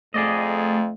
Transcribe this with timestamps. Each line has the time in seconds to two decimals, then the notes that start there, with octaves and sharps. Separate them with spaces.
0.14 F2 A3 G#4 D5 D#5